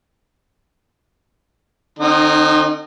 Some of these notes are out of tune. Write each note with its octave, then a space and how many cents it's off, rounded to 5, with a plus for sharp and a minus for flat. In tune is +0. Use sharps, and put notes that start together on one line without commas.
D#3 -45 C4 +30 D#4 -15